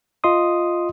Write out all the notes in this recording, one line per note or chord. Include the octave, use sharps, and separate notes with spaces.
F4 D#5 C6 D#6